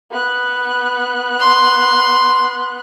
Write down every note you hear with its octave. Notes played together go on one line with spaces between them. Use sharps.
B3 F#6
C6